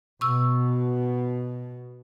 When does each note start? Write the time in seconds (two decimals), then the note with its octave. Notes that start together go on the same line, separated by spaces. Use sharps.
0.21 B2 C#6 E6